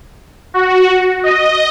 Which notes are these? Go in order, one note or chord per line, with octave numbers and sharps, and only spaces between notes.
F#4
D#5